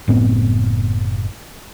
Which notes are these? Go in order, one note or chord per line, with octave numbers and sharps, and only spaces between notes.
F#1 A2 B3 C4